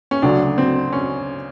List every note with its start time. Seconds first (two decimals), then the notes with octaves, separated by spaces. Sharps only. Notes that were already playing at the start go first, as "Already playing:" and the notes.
0.11 C#4
0.22 D2 C#3 F#3 D4
0.58 C4
0.92 C#4